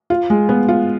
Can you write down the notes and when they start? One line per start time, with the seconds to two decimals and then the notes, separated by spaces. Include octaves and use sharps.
0.10 F4
0.30 G#3
0.49 B3
0.68 F4